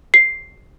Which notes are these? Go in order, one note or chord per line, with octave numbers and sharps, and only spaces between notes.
C7